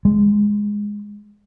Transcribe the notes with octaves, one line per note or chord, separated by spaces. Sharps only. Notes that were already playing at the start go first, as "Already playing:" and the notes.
G#3